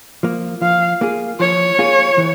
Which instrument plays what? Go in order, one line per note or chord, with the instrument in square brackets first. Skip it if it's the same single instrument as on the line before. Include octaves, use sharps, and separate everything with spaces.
[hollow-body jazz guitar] F3 A#3
[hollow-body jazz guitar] F3 [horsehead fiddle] F5
[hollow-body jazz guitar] A#3 F4 G#4
[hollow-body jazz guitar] F3 [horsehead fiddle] C#5
[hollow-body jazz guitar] A#3 F4 G#4
E3